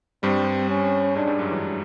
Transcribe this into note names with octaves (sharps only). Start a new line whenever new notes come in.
G2 G3 C4
C#4
G#2 G#3 D4
G2 G3
F#2 F#3
E3